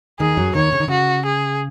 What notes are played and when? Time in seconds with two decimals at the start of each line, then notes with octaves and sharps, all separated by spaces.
0.19 D#2 D#3 G#4
0.37 F#2 F#3
0.54 D#2 D#3 C#5
0.73 C#3
0.80 D#3
0.88 C#3 F#4
1.25 G#4